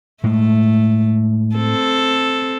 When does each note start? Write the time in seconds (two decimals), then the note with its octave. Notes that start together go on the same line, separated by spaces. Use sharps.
0.24 A2 G#3 A3
1.56 C4 A4